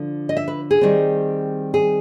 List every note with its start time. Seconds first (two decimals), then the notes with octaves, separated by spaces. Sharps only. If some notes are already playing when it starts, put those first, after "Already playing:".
Already playing: D3 F3
0.29 D#5
0.37 E5
0.48 B4
0.71 G#4
0.81 D#3 G3 C4
1.74 G#4